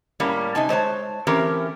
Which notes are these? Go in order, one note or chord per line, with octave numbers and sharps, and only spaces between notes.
A2 G3 A#3 C#4
C3 D#4 G#5 A5
G#3 C5 C#5 A5
E3 A3 C4 C#4 G4 A#4